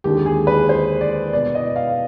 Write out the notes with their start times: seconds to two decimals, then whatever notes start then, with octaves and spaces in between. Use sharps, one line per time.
0.04 D#2 D3 G#3 G4
0.26 G#4
0.47 B4
0.69 C5
1.01 D5
1.33 B2 B3 D5
1.55 D#5
1.76 F5